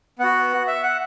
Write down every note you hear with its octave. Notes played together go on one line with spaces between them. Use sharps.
B3 F#4 F#5
E5
F#5